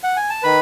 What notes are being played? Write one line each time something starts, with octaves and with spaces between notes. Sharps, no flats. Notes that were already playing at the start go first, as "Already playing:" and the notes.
F#5
G#5
A5
D#3 B4 B5